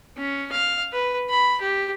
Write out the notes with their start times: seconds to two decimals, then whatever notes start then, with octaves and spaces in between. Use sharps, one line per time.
0.18 C#4
0.52 F5
0.93 B4
1.30 B5
1.61 G4